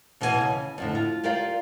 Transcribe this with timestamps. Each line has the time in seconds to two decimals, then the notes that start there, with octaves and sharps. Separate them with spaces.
0.21 D#2 B2 E3 G#4 G#5
0.41 C#3
0.78 F2 A2 D3
0.95 F4
1.24 F4 G4 A#4 D5 F5